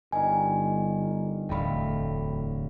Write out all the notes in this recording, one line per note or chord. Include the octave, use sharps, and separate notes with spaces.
G1 D#3 G3 A#4 G#5
D1 E2 A2 D3 F5 G5 B5